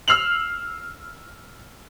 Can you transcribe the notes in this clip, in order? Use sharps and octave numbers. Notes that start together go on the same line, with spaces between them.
E6 F6 C7 F7 F#7